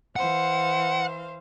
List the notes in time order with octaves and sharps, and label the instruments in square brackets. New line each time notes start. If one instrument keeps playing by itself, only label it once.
[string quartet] E3 C5 F5 [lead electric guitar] F#5